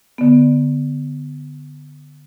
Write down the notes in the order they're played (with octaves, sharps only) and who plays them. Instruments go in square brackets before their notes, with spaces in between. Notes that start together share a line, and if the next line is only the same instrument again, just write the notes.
[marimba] D3 B3